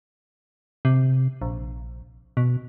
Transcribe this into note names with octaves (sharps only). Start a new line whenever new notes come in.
C3
A#1
B2